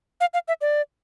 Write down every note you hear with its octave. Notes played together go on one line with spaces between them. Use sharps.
F5
F5
E5
D5